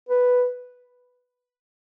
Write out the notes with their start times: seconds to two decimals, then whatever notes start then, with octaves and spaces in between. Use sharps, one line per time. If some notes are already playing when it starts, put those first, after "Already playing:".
0.09 B4